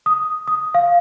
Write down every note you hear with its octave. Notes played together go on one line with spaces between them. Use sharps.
D#6
D#6
F5